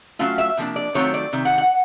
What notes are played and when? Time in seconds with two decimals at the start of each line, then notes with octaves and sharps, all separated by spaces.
0.19 F#3 A3 C#4 F4 F5
0.38 E5
0.57 C3 F3 A#3 D4
0.76 D5
0.94 D#3 F#3 A3 C4 F4 C#5
1.14 D5
1.33 C3 D#3
1.45 F#5
1.58 F#5